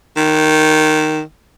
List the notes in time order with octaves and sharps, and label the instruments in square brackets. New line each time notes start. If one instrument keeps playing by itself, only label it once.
[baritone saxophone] D#3